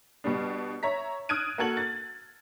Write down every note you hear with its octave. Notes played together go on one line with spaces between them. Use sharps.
B2 G3 D4
C#5 E5 A#5 B6
D#6 F6 F#6 G#6 D7 D#7
A#3 F#4 A4 G#6 F#7
A6